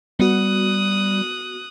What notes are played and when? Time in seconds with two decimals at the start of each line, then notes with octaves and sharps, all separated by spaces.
0.20 G3 B3 F#4 D#6 F#6